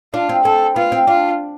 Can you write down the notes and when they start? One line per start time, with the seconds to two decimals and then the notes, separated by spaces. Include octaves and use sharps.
0.14 D4 F4
0.29 C4
0.44 C4 A4
0.76 B3 F4
0.92 C4
1.07 D4 F4